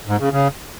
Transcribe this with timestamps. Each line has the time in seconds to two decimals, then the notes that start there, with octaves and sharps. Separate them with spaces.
0.08 G#2
0.19 C#3
0.31 C#3